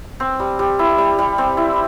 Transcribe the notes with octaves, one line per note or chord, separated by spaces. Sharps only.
C4
G3
G3
E4
G3
G3
C4
E4